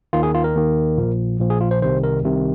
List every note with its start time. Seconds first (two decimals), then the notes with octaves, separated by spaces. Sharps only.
0.13 D#2 D#3 F4
0.23 G#4
0.34 F4
0.44 A#4
0.56 D#2 D#3
0.98 A#1 A#2 F3
1.39 A#1 A#2 F3
1.50 G#4
1.61 F4
1.71 C5
1.82 C2 C3 D#3 C5
2.04 A#4
2.24 C2 C3 D#3